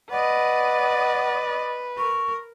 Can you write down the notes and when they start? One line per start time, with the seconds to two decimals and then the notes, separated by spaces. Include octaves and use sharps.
0.11 B4 D5 D#5 F#5
1.98 A#4 C#6